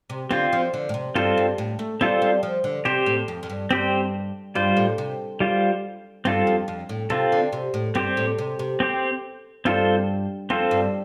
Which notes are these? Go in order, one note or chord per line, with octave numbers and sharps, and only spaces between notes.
C3
D3 C4 F4 C5
F3
D3
A2
C3
G2 C4 F4 A4 C5
G2
A2
A3
G3 C4 F4 A4 C5
G3
F3
D3
C3 C4 G4 C5
A2
F2
F2
G2
G2 C4 G4 C5
G2 G3 F4 C5
A2
C3
G3 F4 C5
G2 C4 F4 A4
F2
F2
A2
C3 C4 F4 A4
D3
C3
A2
G2 C4 G4 C5
A2
C3
C3
C4 G4 C5
G2 C4 F4 A4 C5
F2 C4 F4 A4 C5
G2